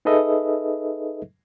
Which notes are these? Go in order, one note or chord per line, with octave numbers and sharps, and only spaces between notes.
D#4 G#4 A4 B4 D#5 E5